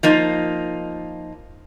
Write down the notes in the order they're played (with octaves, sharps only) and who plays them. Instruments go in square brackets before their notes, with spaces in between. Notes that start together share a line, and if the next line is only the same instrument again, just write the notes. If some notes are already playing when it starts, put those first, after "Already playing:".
[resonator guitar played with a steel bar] F3 A#3 D#4